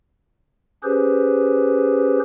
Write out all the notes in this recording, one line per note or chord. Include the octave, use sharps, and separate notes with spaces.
C#4 G4 G#4 B4 C5